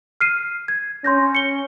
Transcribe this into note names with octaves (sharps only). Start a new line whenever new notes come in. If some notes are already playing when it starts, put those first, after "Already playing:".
F6 C7 D#7
G#6
C#4 C6 G6 A#6
C#7 G7